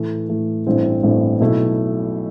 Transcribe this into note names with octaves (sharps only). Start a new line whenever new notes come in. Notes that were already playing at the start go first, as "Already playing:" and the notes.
Already playing: A2 E3 A3
A2 E3 A3
A1 G2 E3 A3 C4
A1 G2 E3 A3 C4
B1 B2 A3 E4